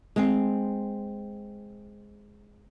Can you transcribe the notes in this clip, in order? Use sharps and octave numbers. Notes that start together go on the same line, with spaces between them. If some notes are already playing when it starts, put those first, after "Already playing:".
G#3 C4